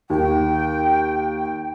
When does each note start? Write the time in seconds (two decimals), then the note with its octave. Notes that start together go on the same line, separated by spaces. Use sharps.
0.10 D#2 G5